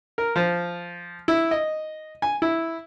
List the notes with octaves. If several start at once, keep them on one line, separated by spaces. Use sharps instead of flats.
A#4
F3
E4
D#5
G#5
E4